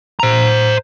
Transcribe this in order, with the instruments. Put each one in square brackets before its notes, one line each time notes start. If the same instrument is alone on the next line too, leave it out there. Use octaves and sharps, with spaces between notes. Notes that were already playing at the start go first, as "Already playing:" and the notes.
[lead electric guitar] C5 A#5